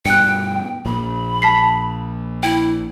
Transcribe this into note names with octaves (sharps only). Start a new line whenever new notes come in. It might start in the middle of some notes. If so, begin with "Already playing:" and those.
G2 B2 G5 F#6 C#7
A#1 A#2 B5
A5 B6 C7
E4 G5